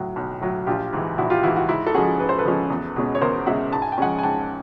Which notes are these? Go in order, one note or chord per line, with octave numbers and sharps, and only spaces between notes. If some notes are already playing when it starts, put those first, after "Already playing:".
Already playing: A2 F#3
B1
A2 F#3
A#1 F4 G4
G#2 E3
A#1 E4 F#4
F4 G4
G#2 E3 E4 F#4
E4 F#4
G#2 E4
A4
F3 G#3 C#4 F#4 G#4
G#2 B4
C5
A4 B4
F3 G#3 C#4
E2
B2 G#3 C#4
C#5
E2 A#4 C5
B2 G#3 C#4 E5 F#5
G#2 A5
G#5
G5
F3 G#3 C#4 F#5 G#5
G#5
G#2 G5 A5